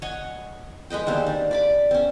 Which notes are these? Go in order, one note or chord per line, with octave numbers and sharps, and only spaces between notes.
C#5 D#5 F#5 G#5
G#3 B4 D#5 G5
D#3 G3 A#3 C4
D4
D5 B5 D6
C4 C#4